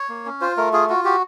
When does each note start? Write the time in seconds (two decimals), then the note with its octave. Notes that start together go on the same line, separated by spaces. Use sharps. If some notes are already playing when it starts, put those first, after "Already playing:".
Already playing: C#5
0.09 A#3
0.26 C#4
0.41 F4 C5
0.57 A3 A#4
0.73 F4 G#4
0.89 F4 F#4
1.05 F#4 G4